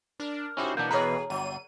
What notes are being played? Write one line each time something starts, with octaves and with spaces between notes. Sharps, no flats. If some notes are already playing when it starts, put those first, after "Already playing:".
D4 A#4
C#4 D#4 E4 F#4 G4 C5
B2 E3 A#3 B3 D4 G6
A3 G#4 A#4 B4 C#5 D#5 A#5
G1 F#3 D#7